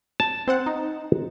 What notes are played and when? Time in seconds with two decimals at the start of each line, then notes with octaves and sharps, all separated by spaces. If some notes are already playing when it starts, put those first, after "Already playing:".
0.20 A5
0.48 C4 C5 F#5
0.66 D#4